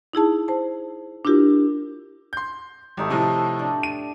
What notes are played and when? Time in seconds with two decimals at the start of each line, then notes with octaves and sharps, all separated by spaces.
0.13 D#4 E4 G#4 A5
0.48 C5 A5
1.25 D4 E4 F4 G4 A#4
2.33 C6 G6
2.97 G#1 A3 D#4 G4
3.10 A2 C3 F3 A5 D#6
3.59 D4
3.83 D#7